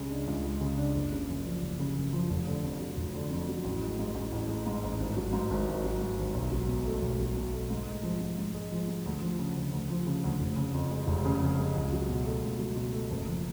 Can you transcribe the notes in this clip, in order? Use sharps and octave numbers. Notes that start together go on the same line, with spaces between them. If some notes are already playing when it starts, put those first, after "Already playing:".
Already playing: C#2 C#3 G#3
D4
C#2
G#3
C#3
D4
F#1
C#3
F#2
F3
F#1
C#3
F#2
F3
F1
D3
F2
F#3
F1
D3
F2
F#3
A1
G#3
G#2
A1
A1
G#3
G#2
A1
G#1
F#3
G#2
G#1
G#1
F#3
G#2
G#1
B1
F#3
B2
A3
B1
F#3
B2
A3
G#2
G#3
F3
G#2
G#2
G#3
F3
G#2
D2
F3
C#3
D2
D2
F3
C#3
D2
F1
C#3
F2
G#3
F1
C#3
F2
G#3
C#2
F#3
B2
A3
C#2
F#3
B2
A3
F#1
F3